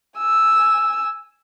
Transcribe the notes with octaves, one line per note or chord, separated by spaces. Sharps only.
G#5 E6